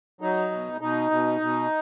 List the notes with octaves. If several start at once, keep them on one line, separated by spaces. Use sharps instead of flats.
F#3 D#4
B2
B2 D#4
B2
B2